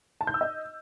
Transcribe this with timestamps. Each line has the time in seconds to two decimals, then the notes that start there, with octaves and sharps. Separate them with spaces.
0.21 A5
0.27 G6
0.34 E6
0.41 D#5